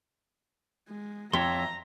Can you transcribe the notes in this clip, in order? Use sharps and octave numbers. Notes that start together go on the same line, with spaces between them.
G#3
F2 C#5 E5 A#5 C6